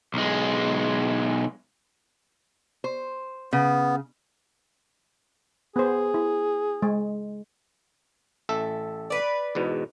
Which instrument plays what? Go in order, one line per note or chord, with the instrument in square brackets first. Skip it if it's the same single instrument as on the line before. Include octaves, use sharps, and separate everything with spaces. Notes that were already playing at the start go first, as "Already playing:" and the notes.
[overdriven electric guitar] B1 G#3
[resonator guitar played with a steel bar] C5
[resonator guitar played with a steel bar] C#3 [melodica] B3
[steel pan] B3 C5 [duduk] G#4
[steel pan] E4
G#3
[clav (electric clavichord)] A1 A4 E5
[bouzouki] B4 D5
[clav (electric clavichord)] E2 G#2 B2